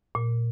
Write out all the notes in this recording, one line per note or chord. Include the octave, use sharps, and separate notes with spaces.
A#2